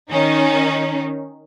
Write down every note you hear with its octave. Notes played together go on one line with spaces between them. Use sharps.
D#3 C#4 D#4